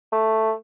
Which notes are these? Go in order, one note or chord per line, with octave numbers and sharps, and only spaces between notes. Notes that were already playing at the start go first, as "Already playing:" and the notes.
A3